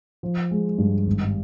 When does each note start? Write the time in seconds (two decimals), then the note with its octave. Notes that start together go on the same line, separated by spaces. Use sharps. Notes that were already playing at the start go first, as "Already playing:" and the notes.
0.23 F3
0.51 G#3
0.78 G2
1.07 G#1